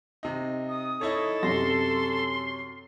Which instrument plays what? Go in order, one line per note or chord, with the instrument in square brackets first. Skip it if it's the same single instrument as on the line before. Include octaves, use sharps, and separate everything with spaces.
[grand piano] C3 D#4
[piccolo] D#6
[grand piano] D#4 E4 C#5 [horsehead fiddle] A4
[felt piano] F#2 C3 [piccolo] C6 [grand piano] A#6